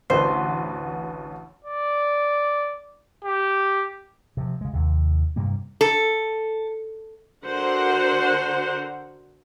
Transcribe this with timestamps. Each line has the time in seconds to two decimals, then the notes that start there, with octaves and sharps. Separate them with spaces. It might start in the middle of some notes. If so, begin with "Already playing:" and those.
0.10 A1 D2 B4 C5
1.65 D5
3.25 G4
4.37 C3 F3
4.61 C#3 G#3
4.73 D#2 C3
5.36 G2 C3 G3 A#3
5.81 A4
7.44 D3 F#4 A#4 C5 F#5